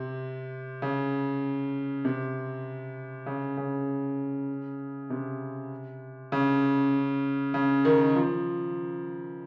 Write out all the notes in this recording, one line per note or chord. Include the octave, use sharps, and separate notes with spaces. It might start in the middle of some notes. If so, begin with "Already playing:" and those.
Already playing: C3
C#3
C3
C#3
C#3
C3
C#3
C#3
D#3
F3